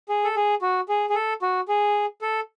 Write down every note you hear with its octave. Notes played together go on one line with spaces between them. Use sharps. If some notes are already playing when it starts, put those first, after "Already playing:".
G#4
A4
G#4
F#4
G#4
G#4
A4
F#4
G#4
A4